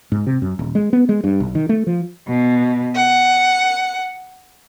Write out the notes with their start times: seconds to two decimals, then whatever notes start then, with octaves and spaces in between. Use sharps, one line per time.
0.12 G#2
0.27 C3
0.42 F#2
0.59 D#1
0.75 G#3
0.93 B3
1.09 G#3
1.24 G2
1.40 B1
1.55 D#3
1.69 A3
1.87 F3
2.28 B2
2.95 F#5